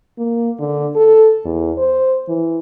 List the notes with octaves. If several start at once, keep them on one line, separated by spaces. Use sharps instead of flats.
A#3
D3
A4
E2
C5
E3